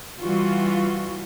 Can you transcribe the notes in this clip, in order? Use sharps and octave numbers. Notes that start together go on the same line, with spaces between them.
E3 G3 F4 F#4